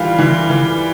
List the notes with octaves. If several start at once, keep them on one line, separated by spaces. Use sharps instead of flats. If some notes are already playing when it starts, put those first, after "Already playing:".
Already playing: E3 G3 F4 F5
E3
E3